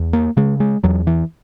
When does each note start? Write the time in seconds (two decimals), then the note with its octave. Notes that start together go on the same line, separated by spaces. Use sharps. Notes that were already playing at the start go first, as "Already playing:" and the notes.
Already playing: E2
0.13 A#3
0.37 C#3 G#3
0.60 G#3
0.84 E2 F#3
1.07 E3